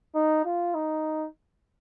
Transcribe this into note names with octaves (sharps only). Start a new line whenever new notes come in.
D#4
F4
D#4